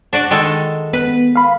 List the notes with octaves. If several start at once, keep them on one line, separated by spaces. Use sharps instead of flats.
D4 F#4 D5
D#3 G#3 A4
B3 B4
F5 B5